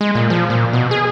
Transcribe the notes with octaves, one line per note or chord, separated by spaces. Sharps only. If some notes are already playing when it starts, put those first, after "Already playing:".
G#3
A#2
F3
A#2
B2
G#4